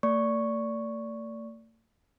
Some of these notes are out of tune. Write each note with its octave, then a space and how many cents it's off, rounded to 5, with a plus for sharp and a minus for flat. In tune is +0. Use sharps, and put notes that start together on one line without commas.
A3 +45 D5 -20 C#6 +0